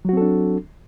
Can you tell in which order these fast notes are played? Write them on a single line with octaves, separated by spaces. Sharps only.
F#3 F#4 C4 A4 D4